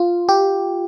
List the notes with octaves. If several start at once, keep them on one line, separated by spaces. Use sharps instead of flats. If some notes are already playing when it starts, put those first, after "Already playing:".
Already playing: F4
G4